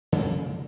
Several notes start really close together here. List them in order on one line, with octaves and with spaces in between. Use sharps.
C#3 A#3 F2